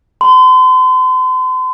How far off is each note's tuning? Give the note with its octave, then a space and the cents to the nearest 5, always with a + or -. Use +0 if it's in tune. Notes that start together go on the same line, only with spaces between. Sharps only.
C6 -40